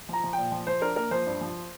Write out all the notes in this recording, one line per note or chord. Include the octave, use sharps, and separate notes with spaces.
F3 A#5
F3
A#2 G5
F3
F3 C5
D4 A#4
A#3 A#4
F3 C5
G2
F3